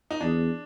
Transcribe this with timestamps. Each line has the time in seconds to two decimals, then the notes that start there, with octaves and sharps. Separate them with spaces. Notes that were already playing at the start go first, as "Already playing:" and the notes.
0.11 D#4
0.21 E2 D4